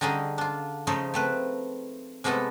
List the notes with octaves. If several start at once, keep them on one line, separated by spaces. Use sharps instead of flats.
D3 G3 C#4 D#4 G#4
D4 F4
C#3 F3 A3 D#4 C5 C#5
A3 C4 B4
C3 G#3 A3 B3 E4 A4